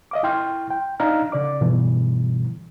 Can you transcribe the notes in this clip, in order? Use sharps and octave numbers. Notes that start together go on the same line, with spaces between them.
D#5 F5 D6
E4 G5 C6 F6
G5
D4 D#4 D#5 F5 A#5 F6
C#3 D5 D6
G2 B2 D3 E3 G3